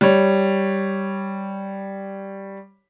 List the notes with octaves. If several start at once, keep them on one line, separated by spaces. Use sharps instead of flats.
G3 C#5